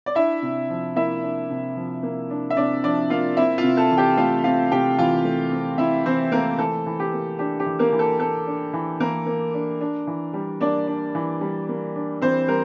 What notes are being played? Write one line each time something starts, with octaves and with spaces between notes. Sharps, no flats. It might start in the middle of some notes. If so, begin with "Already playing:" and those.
D5
D4 E4 E5
C3
F3
A#3 E4 E5
D4
C3
F3
A#3
D4
E5
C3 D4 D5
F3 D4 D5
A#3 F4 F5
C4 E4 E5
F4 F5
C3
A4 A5
E3
G4 G5
A3 F4 F5
C4 F4 F5
C3 G4 G5
E3 F4 F5
A3
C4
C3 E4 E5
E3 C4 C5
A3 A#3 A#4
E3 A4
E3
G4
A#3
D4 G4
G4
E3
A#3 A#4
E3
A4
A#3 A4
D4
E3
E3 A#3 A#4
A#3
D4
D4
E3
G3
A#3 D4 D5
D4
E3
G3
A#3
D4
E3 C4 C5
G3 A#4